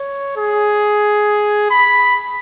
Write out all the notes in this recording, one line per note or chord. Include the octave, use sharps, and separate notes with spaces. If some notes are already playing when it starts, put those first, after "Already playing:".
Already playing: C#5
G#4
B5